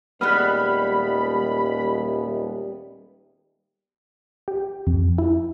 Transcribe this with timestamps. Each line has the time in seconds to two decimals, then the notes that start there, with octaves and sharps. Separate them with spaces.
0.21 D#1 G3 G#3 B3 B5 F6 F#6
4.48 G4
4.87 F2
5.18 E4